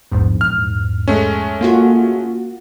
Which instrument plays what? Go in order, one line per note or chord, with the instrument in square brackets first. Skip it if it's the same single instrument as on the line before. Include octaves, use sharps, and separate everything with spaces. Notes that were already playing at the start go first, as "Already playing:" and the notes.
[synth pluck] A#1 E2 G#2
[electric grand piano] F6
G#3 A3 C#4
[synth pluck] A#3 F4 F#4